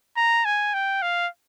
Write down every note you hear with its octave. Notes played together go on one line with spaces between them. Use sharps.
A#5
G#5
G5
F5